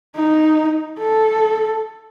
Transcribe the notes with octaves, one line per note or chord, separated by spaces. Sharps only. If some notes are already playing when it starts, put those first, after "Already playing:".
D#4
A4